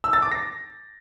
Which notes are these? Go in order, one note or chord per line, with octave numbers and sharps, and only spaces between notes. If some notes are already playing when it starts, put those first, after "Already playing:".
E6
A6
D6
A#6